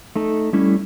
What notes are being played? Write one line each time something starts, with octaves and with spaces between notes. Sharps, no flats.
A3 D#4 A4
G3 A3 C#4 E4